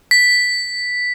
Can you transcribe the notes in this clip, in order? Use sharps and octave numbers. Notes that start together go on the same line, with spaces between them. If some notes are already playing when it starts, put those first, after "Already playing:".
B6